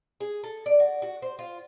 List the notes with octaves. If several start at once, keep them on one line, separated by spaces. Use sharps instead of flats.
G#4
A4
D5
F#4
F#4
C5
F4